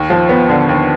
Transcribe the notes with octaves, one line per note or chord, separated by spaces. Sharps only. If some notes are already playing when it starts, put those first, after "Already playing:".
Already playing: D#2
F3
B3
D3
D#2